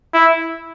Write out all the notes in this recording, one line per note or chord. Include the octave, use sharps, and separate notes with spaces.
E4